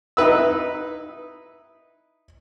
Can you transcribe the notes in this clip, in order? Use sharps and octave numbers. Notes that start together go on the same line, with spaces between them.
D#4 E4 B4 E6